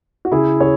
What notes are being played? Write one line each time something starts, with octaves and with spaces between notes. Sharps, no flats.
F#4
C#3 E4 G#4
C#3 G#4 C#5